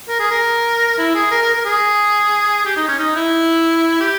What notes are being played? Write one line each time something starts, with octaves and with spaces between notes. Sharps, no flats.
A#4
G#4
A#4
E4
G#4
A#4
A#4
A#4
G#4
G4
D#4
C#4
D#4
E4
G4